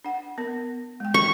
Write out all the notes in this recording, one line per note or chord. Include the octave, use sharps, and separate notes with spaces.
D4 F#5
B3 A#4
G#3 G5
C#6